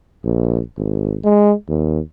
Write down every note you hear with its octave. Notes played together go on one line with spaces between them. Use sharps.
A#1
G#1
G#3
D#2